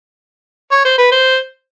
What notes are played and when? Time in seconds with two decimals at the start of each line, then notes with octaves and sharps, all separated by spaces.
0.72 C#5
0.85 C5
0.98 B4
1.12 C5